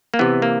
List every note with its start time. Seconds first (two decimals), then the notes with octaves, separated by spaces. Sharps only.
0.14 A#3
0.19 C3 E3 B3
0.42 A#3